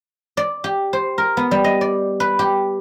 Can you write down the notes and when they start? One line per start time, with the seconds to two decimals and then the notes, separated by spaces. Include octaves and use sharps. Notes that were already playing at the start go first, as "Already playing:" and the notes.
0.37 D5
0.64 G4
0.93 C5
1.18 A#4
1.37 B3
1.51 G3
1.64 D#5
1.81 D5
2.20 B4
2.39 G4